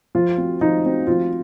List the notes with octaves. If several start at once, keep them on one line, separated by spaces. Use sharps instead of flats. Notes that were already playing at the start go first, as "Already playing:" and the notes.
F3 F4
C4 F#4
F3 D#4
C4 F#4
F3 F4